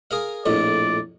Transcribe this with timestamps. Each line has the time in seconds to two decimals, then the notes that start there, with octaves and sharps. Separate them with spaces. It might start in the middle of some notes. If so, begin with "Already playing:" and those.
0.11 G#4 A#4 F5
0.46 A#1 F2 A2 D5